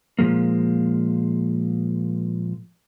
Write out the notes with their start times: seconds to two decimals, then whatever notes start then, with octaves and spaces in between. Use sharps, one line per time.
0.19 A#2 F3 G#3 A#3